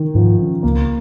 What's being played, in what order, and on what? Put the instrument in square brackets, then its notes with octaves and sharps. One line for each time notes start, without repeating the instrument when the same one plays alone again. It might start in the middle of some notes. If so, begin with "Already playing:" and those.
Already playing: [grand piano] D#3
[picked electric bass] G#2 [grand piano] F3
[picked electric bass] D#3 C#4
[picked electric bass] C#2 [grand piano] A#3